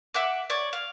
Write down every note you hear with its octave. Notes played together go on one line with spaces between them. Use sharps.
E5 F#5 D6
C#5 D5
F5